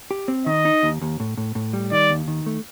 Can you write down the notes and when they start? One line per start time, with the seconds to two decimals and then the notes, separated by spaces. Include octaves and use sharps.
0.11 G4
0.28 C4
0.46 D#3 D#5
0.65 D#4
0.83 D#2
1.01 D#2
1.20 A2
1.37 A2
1.55 A2
1.73 G3
1.91 D#3 D5
2.10 D#2
2.28 D#3
2.46 A3